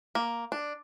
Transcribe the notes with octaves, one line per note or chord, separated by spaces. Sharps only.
A#3
D4